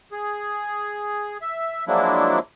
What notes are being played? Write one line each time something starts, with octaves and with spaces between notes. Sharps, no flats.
G#4
E5
F3 F#3 G#3 A#3 D4 E4